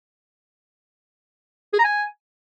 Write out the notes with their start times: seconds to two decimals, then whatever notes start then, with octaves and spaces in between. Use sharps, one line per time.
1.73 G#4
1.79 A#5
1.84 G#5